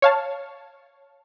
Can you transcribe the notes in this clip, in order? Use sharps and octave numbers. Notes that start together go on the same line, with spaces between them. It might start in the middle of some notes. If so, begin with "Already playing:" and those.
C#5 F5 A5